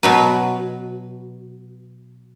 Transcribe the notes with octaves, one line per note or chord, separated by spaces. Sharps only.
B2 F#3 B4